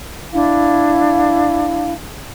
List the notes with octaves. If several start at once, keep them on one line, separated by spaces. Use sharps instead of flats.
D4 E4 F5